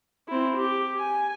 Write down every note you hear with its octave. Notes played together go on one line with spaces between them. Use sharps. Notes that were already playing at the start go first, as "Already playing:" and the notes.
C4 E4
G4
G#5